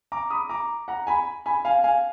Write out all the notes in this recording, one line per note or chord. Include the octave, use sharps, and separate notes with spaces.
A#5 D6
B5 D#6
A#5 D6
F#5 A#5
G#5 B5
G#5 B5
F5 G#5
F5 G#5